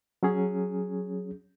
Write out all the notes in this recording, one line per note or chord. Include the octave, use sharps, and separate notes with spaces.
F#3 C#4 G#4